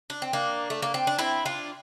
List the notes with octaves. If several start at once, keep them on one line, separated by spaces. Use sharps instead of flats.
D4
C4
A#3 D4
A3
A#3
C4
D4
C4 E4
D4 F4